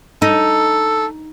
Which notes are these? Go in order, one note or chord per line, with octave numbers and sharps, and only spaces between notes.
D#4 A4